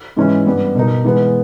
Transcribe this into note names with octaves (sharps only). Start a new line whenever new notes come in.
G#2 E3 G#3 C#4 E4
G2 G3 B3
B2 A#3 D#4
E3 G#3 B3